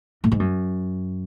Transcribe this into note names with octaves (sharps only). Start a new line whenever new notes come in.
A2
G#2
F#2